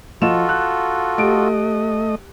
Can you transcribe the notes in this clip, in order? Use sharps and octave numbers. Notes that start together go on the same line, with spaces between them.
F3 F4 F#4 A4 D#5 E7
F#6
A3 G4 D#5 D7